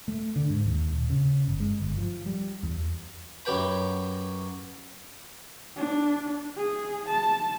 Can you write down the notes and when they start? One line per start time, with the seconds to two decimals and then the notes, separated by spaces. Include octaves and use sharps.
0.08 A3
0.36 D3
0.50 G#2
0.66 D#2
0.93 D#1
1.10 C#3
1.48 G1
1.60 G#3
1.80 G1
1.98 F3
2.26 G3
2.63 E2
3.45 F#2 F#3 G4 B4 G5 B5
5.76 D4
6.57 G#4
7.08 A5